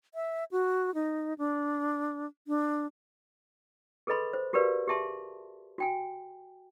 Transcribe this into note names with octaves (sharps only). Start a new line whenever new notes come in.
E5
F#4
D#4
D4
D4
G#4 A4 B4 D#5 B5 C6
C5
F#4 G4 A#4 B4 D5 F5
G4 G#4 E5 A5 C6
F#4 G5 G#5